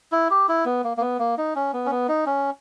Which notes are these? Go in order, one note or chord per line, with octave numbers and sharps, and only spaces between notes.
E4
G4
E4
B3
A#3
A#3
B3
A#3
D#4
C#4
B3
C#4
B3
D#4
C#4